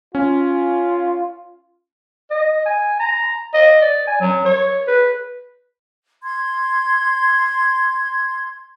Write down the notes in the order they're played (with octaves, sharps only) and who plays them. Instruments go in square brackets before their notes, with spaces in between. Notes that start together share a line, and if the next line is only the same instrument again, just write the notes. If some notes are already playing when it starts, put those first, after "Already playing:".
[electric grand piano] C#4 [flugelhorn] F4
[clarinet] D#5
G#5
A#5
D#5
D5
G#5
F#3
C#5
B4
[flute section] C6 G#6